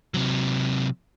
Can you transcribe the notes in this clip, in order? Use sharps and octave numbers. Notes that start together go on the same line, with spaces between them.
C3 F#3